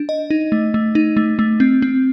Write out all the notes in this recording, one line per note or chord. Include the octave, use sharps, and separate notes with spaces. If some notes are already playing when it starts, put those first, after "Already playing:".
Already playing: D4
D#5
D#4
A3
A3
D#4
A3
A3
C4
C4